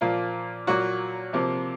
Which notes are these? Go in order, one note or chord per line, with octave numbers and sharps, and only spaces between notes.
A#2 F3 A#3 F4
A#2 F#3 A#3 F#4
C3 F3 A#3